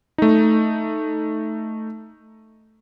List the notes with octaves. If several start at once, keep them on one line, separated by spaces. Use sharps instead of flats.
A3 D#4